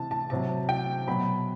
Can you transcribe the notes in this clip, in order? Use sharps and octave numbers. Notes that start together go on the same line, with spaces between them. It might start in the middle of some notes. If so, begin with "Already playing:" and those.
Already playing: C3 E3 A5
A5
C3 F#3 A5
G5
B2 F#3 B5